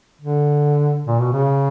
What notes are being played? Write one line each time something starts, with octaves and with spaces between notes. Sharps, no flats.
D3
A#2
B2
C#3